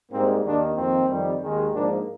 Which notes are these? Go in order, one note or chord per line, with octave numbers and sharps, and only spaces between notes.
G#2 G3 A#3 C4
D#2 D#3 A#3 D4
F2 D#3 A#3 C4
F2 D#3 G3
D#2 D#3 G#3
G#2 F3 A#3 D4